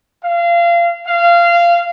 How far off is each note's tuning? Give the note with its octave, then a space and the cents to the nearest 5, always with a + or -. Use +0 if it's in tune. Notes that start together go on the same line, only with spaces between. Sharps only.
F5 -25
F5 -20